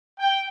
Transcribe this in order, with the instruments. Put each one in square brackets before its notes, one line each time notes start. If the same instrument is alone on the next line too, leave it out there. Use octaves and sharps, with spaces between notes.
[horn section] G5